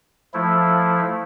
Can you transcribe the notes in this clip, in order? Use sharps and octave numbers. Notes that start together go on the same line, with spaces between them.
F3 A3 E4